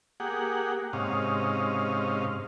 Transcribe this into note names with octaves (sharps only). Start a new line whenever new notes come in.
A#3 G4 G#4 F#5
G#2 C3 C#4 D#5 F5